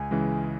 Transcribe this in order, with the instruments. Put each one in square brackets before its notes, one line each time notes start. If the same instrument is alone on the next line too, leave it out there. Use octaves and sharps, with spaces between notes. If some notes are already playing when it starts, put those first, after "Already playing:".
Already playing: [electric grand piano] C#2 [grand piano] G#5
[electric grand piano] C#3 E3 G#3